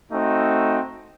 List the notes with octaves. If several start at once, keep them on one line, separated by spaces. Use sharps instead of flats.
A3 C4 D#4 F#4